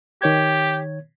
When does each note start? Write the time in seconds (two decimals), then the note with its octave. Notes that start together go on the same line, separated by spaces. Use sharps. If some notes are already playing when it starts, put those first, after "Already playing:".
0.22 D#3 G4 C#5 G#6